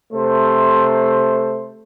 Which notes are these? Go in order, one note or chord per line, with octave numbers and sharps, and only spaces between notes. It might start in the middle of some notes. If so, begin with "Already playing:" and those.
C3 A3 C5